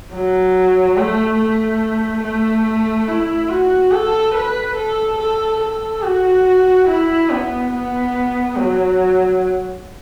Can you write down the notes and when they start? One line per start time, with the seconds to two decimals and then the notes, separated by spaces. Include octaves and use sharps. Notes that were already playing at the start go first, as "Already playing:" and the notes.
0.13 F#3
0.97 A3
1.39 A3
2.23 A3
3.08 E4
3.50 F#4
3.92 A4
4.35 B4
4.76 A4
5.18 A4
5.61 A4
6.03 F#4
6.88 E4
7.30 B3
7.72 B3
8.56 F#3